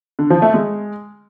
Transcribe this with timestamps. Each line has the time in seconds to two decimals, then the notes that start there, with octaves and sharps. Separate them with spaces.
0.19 D3
0.30 F3
0.42 A3
0.54 G#3